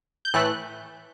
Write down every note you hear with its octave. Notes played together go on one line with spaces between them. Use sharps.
G6
A2 E3 A3 F#6